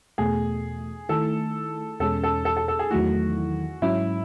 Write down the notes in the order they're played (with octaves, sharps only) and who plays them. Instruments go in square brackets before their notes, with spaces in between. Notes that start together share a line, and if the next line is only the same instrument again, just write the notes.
[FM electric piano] E2 B2 A3 [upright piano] G#4
[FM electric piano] D#3 A3 E4 [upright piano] A4
[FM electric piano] E2 B2 G#3 C#4 G#4 [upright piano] A4
[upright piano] A4
A4
A4
A4
G#4
[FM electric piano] E2 D#3 F#3 A3 E4 [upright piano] F#4
[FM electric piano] G#2 F#3 C#4 [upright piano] E4